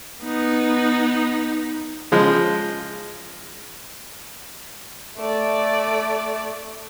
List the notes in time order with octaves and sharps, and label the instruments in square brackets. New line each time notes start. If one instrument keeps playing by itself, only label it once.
[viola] B3 D#4
[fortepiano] C#3 F3 G#3
[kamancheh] A3 D5